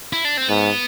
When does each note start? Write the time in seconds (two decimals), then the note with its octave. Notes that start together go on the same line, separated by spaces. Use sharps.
0.13 E4
0.25 D4
0.37 C4
0.49 G#2 B3